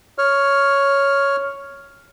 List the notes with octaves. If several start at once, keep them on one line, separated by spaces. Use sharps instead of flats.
C#5 F6